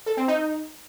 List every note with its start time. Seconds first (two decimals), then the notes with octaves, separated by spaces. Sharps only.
0.06 A4
0.17 C4
0.28 D#4